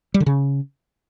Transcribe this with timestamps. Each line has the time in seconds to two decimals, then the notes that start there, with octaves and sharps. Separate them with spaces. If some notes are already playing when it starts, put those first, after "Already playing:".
0.14 G3
0.20 D3
0.26 C#3